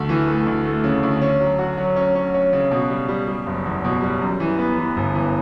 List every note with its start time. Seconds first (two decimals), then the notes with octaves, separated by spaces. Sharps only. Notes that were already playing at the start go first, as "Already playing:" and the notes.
Already playing: D2 A3
0.09 E3
0.28 A3
0.47 D2
0.66 A3
0.84 C#3
1.03 D2
1.22 C#4
1.40 F#3
1.59 F#4
1.78 F#3
1.96 C#4
2.15 C#4
2.34 C#4
2.53 C#3
2.71 B2
2.90 G3
3.08 G3
3.27 G3
3.46 F#1
3.66 E2
3.84 B2
4.02 G3
4.21 F#2
4.40 E3
4.59 B3
4.78 E3
4.97 G1
5.15 E3